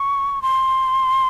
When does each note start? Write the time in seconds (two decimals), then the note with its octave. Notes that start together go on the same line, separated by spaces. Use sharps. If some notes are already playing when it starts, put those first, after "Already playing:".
Already playing: C#6
0.42 C6